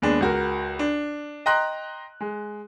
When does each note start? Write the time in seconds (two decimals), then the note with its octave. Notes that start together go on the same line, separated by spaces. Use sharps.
0.02 D#2 G#3 B3 D4
0.20 C#2 F#4 A#4
0.79 D4
1.46 D#5 G5 A#5 C6 F#6
2.21 G#3